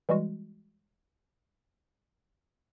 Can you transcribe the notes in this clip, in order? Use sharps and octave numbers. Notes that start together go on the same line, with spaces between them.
E3 G3 G#3 F#4